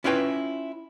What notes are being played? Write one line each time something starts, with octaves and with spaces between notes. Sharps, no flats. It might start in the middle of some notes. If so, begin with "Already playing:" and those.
C#4 E4 F4 B4 C#5 G5